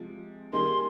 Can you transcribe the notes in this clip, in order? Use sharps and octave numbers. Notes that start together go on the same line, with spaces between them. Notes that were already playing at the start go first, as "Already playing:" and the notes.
Already playing: C3 F3 G#3
D#3 G3 A#3 D#4 G#4 C6